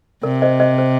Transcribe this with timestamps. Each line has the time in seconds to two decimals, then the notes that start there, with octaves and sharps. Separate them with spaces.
0.23 C3 A#4 D5
0.42 C5 D#5
0.60 C5 D#5
0.78 C5